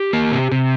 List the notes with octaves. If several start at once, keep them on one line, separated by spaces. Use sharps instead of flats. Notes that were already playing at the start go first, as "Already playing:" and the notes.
Already playing: G4
A#3
C3
C3